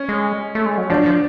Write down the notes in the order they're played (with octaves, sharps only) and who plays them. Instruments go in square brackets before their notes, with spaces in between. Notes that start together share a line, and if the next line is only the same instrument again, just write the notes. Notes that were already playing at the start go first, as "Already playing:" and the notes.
Already playing: [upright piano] C#4
[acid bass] G#3
A3
G#3
F#3
[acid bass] F3 [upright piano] D4
[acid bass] F3